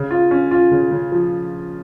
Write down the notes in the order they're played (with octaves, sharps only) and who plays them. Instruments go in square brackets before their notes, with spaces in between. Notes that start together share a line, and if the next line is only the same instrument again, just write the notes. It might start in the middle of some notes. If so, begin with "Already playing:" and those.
Already playing: [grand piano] C#3
F4
C#4
F4
C#3
C#3
F3